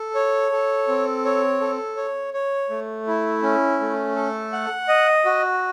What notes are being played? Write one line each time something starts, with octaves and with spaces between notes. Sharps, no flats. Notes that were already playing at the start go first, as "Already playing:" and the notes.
Already playing: A4
C#5
A4
C4
C#5
A4
C#5
C#5
A3
E4
C#4
A3
A4
F#5
D#5
F#4